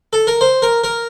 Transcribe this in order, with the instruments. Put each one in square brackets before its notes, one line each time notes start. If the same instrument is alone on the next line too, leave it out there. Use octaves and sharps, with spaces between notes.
[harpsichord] A4
A#4
C5
A#4
A#4